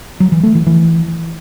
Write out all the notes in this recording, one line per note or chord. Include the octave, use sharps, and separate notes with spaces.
F#3
E3
A3
E3
E3